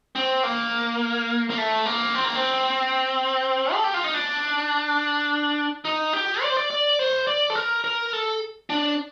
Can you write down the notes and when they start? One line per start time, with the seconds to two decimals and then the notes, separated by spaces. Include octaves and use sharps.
0.15 C4
0.43 A#3
1.50 A#3
1.58 A3
1.86 A#3
2.15 C4
2.25 A#3
2.35 C4
3.74 A4
3.84 G4
3.94 F4
4.04 D#4
4.14 D4
5.85 D#4
6.13 G4
6.42 D5
6.50 C5
6.57 D5
6.70 D5
6.99 C5
7.27 D5
7.50 A4
7.55 A#4
7.84 A#4
8.13 A4
8.70 D4